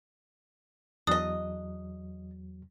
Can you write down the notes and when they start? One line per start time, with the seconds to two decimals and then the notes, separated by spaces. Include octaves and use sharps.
1.07 E2 F#3 D4 D#5 D#6